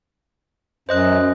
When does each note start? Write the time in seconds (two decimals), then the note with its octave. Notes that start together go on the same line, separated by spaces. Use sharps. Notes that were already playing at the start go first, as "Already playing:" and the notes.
0.89 F#2 C5 D#5 F#6